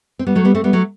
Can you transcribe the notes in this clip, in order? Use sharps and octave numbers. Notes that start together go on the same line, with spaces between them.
C4
G3 B3
F#3 A3
G3 B3
A3 C4
G3 B3
F#3 A3